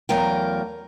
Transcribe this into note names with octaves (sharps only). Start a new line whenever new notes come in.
E2 F#3 A3 A#4 F5 G5